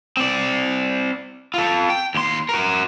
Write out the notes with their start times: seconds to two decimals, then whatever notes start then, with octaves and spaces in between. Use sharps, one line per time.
0.17 C4 D5
1.54 F4 A4
1.90 G5
2.14 D#2 C6
2.49 F#4 A#4